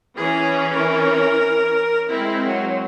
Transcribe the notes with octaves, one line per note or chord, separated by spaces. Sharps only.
E3 C#4 G#4
A#4
G#3 C4 E4
F#3